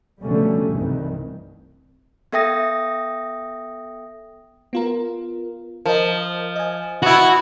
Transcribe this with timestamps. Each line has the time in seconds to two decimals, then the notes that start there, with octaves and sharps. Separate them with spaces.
0.22 B2 D3 F3 G3 A3 C#4
0.71 C2 G2 D#3 E3
2.32 B3 A4 E5 G5 D#6 A#6
4.73 B3 F4 A#4
5.86 F3 A#4 D#5
6.56 D#5 G#5
7.02 B3 E4 F#4